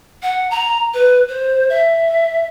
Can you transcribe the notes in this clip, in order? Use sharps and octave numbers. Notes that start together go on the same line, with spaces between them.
F#5
A#5
B4
C5
E5